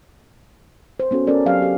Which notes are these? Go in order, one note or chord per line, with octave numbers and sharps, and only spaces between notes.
C5
B3 C#4 F#4 A4
C#4 A4 A#4 D5
F#3 C4 G4 F5
G4 A4